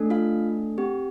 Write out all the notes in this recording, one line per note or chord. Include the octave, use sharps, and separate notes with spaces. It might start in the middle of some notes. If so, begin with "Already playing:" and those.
Already playing: A3 D4 A4
F4 F5
C4 G4